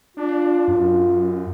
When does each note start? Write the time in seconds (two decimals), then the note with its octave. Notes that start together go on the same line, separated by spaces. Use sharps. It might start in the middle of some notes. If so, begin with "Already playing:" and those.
0.17 D4 F4
0.68 F#2